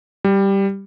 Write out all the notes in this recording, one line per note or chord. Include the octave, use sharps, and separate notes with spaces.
G3